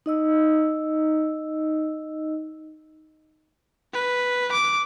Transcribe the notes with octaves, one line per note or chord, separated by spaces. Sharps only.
D#4 D#5 E6
B4
D6